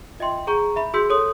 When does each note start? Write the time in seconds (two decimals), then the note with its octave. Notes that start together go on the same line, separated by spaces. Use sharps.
0.19 F4 D#5 E5 G5 C6
0.47 G#4 F#5 A#5 C#6 G6
0.76 E5 B5
0.94 F#4 G#4 C6 E6 G6 B6
1.10 A4 C#5 C6 D#6